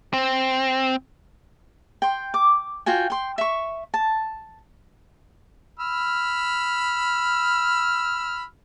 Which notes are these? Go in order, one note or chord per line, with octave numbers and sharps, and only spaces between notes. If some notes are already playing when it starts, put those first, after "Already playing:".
C4
G5 C6
D6
F4 F#4 G5 G#5
G5 C6
E5 C#6
A5
B5 E6 F6